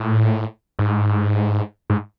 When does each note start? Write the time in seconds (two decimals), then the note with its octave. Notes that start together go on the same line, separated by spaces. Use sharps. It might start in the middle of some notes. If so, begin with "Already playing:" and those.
Already playing: A2
0.79 G#2
1.90 G#2